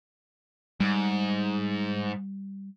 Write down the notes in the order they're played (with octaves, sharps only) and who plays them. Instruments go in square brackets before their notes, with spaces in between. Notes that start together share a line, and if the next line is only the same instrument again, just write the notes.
[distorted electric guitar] G#2 [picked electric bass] G3